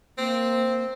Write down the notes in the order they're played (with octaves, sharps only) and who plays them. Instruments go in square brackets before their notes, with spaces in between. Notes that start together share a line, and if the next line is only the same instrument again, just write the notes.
[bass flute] A#3 [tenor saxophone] C4